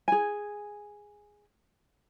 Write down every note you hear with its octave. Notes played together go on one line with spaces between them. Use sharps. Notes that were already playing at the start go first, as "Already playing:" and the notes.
G#4 G#5